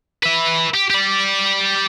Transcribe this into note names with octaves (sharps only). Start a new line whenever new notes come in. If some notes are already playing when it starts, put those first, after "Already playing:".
B4 E5
G4
G4 D5